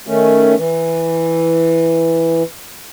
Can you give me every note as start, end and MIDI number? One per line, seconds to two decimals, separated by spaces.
0.07 0.55 51
0.07 0.55 57
0.07 0.55 61
0.57 2.43 52